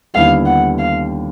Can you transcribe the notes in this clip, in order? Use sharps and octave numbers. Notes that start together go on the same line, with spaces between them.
D#2 D3 G3 B3 E4 F5
F#5
F5